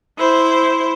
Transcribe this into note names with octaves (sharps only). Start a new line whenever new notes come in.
E4 C5